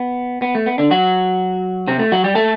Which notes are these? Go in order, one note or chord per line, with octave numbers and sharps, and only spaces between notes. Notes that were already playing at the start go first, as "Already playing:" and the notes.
Already playing: B3
B3
A3
B3
D3 D4
F#3 F#4
C3 C4
A3
F#3 F#4
G3 G4
A3 A4